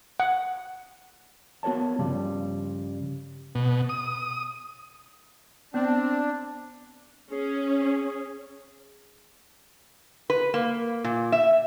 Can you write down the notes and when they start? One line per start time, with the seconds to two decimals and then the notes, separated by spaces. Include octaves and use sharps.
0.20 F#5
1.63 B3 F#4 A#4 C#5 A5
1.99 G2 C#3 F3 G3
3.55 B2
3.89 D#6
5.74 B3 C4 D4
7.32 C#4 G#4
10.30 B4
10.54 A#3
11.04 A#2
11.32 E5